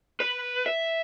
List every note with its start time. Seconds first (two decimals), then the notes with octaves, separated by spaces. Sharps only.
0.20 B4
0.66 E5